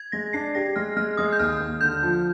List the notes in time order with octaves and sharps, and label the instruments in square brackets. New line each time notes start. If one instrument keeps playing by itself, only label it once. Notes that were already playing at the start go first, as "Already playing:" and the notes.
Already playing: [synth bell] G#6
[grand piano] G#3 [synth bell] A#6
[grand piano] D4 [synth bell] C7
[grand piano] G4 [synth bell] A#6
[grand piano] G#3 [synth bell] F6
[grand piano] G#3 [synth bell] F6
[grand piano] G#3 [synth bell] D#6
[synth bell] G6
[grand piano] D#2 [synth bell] F6
[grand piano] D#2
[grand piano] D3 [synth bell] G6
[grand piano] F3